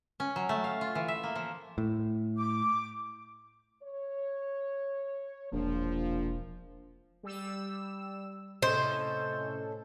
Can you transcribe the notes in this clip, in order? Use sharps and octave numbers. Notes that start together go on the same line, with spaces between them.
C#4
F#3
A3
F5
F4
E3
E5
A#3
F3
A2
D6
C#5
E1 A#1 F3
G3 E6
A2 C3 C#4 A4 C5 D#5